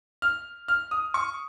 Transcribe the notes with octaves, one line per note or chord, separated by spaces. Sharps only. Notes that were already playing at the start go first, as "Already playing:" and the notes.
F6
F6
D#6
C#6